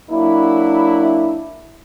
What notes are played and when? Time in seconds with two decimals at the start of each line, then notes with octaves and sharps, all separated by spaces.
0.10 F#3 A#3 D4 E4